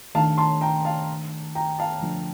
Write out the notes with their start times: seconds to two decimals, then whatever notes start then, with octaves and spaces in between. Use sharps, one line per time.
0.15 D#3 A3 D4 F5 A5
0.38 A5 C6
0.61 G5 A#5
0.85 F5 A5
1.55 G5 A#5
1.78 F5 A5
2.02 D3 F3 A3 D4